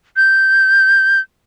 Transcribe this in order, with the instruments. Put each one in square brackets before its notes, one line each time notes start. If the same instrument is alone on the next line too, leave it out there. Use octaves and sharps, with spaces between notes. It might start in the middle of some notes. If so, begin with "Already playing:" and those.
[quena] G6